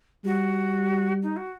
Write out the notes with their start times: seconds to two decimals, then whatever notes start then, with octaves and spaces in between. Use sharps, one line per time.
0.24 G3 F#4
1.23 D#4
1.37 F#4